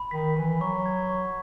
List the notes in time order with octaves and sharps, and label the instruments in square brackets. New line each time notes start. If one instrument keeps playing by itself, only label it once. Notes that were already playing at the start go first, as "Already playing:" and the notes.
Already playing: [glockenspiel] B5
[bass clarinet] D#3 [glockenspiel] B6
[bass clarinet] E3 [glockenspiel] B5
[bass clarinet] F#3 [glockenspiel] C#6
[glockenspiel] G#6
C#6